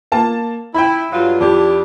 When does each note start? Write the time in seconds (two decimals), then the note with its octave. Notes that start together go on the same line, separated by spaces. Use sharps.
0.12 A#3 A5
0.75 E4 G5 B5
1.12 G2 F#3 F4
1.40 F2 D4 E4 G4